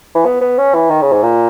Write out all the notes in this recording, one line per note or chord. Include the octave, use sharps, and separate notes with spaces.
E3
B3
B3
C#4
E3
D#3
C#3
G#2
A#2